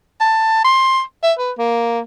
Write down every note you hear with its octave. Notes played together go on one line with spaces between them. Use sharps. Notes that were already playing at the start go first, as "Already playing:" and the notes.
A5
C6
E5
B4
A#3